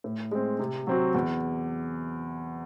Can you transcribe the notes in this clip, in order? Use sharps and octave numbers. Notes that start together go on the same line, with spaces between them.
A2
G#3 C4
C3
F#3 C4 F#4
E2